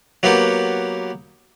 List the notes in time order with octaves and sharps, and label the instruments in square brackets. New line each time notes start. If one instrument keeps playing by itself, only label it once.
[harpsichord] F#3 A#3 B3 G4